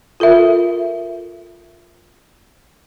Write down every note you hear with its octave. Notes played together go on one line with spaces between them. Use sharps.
F4 A4 A#4 E5